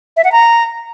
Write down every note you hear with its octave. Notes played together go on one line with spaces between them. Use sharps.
E5
F#5
A#5